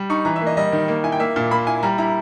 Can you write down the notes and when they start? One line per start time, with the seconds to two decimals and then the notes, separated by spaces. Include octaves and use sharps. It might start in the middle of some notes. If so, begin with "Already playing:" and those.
Already playing: G3
0.10 D#4 C#6
0.25 E3 A#5
0.36 E5
0.41 A#3
0.47 D#5
0.57 G3 D#5
0.72 D#3
0.88 A#3
1.04 E4 G#5
1.12 G5
1.20 A#3 E5
1.36 A#2
1.51 A#3 B5
1.67 E4 G#5
1.83 G3 A#5
1.98 E4 A#5